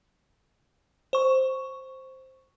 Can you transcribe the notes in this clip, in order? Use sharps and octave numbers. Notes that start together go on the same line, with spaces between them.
C5 C#6